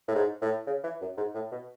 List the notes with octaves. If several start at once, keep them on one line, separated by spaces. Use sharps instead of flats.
A2
G#2
A2
C#3
E3
F#2
G#2
A2
B2